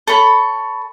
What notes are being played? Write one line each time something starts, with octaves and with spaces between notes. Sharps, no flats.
A4 C#5 B5